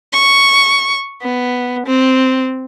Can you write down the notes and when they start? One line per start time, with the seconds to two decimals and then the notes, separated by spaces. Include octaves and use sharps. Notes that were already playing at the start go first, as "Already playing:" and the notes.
0.13 C#6
1.22 B3
1.86 C4